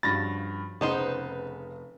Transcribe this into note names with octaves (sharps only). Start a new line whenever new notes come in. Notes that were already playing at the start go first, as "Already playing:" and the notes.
G2 C#3 F3 F#4 B5 A6 A#6
F1 C#3 B3 D#4 C5 E7